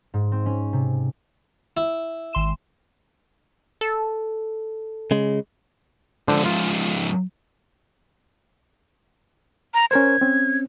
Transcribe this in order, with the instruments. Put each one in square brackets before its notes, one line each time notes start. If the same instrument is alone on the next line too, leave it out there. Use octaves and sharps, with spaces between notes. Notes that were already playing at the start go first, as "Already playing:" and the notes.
[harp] G#2
C4
C#4
C3
[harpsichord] E4
[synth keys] G#1 C6 E7
[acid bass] A4
[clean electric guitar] C#3 G#3
[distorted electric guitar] G#2 F3 [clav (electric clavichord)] D3 D4 C5
[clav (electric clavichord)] F4
[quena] A#5
[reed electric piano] C#4 A#4 C5 [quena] G#6
[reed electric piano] C4 C#4